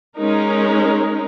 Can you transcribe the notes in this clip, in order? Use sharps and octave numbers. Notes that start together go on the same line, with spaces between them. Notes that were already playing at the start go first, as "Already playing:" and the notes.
G#3 C#4 D#4 A#4